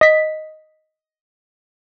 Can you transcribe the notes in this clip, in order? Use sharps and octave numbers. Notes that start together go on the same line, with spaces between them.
D#5 B6